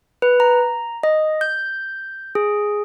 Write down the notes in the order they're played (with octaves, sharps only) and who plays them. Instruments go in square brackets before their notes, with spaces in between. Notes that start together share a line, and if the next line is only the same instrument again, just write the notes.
[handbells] B4
A#5
D#5
G6
G#4